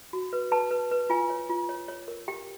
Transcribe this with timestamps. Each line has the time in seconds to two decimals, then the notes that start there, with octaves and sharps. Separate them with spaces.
0.13 F#4
0.33 B4
0.51 B4 A5
0.71 B4
0.91 B4
1.10 F4 G#5
1.30 C#5
1.49 F4
1.69 C#5
1.88 C#5
2.08 A#4
2.28 G4 G5